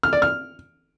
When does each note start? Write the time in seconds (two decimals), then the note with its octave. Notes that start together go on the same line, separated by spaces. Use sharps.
0.03 F6
0.13 D5
0.22 F6